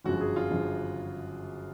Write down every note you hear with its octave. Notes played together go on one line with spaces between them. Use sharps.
G1 F#2 C#3 F3 F#4
G#4
F4
G1 F#2 C#3 F3